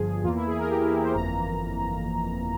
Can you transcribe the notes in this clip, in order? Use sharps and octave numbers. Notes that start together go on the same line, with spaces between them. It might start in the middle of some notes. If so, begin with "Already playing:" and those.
Already playing: G1 G2 F3 G#4
E2 E3 A#3 F4
E4
G#4
A#4
G4
E4
C5
G1 F2 E3 A#3 A#5